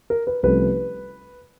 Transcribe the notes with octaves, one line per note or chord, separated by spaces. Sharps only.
A#4
B4
C2 C3 F3 A3 C#4 B4